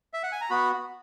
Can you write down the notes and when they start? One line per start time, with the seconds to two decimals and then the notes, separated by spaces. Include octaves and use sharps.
0.14 E5
0.23 F#5
0.32 G#5
0.41 A#5
0.50 B3 F#4 B5